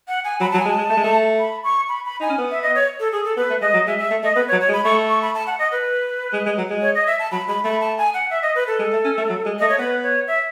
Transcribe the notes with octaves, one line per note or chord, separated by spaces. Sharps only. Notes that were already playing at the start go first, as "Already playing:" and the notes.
F#5
G#5
F#3 B5
F#3 A5
G#5
G#3
A5
G#3
A3
G#3
A3
B5
C#6
B5
B5
D#4 G#5
C#4
B3
E5
D#5
C#5
A4
G#4
A4
B3 B4
A3
G#3 D#5
F#3
G#3 E5
G#3 E5
A3
A3 D#5
B3 B4
C#5
F#3
C#5
G#3
B5
A3 C#6
C#6
B5
A5
F#5
D#5
B4
G#3
G#3
F#3
G#3
C#5
D#5
E5
A5
F#3 B5
G#3 B5
A3 B5
A5
G#5
F#5
E5
D#5
B4
A4
G#3
A3
C#4
A3
F#3
G#3
A3 D#5
C#5
B3 B4
C#5
E5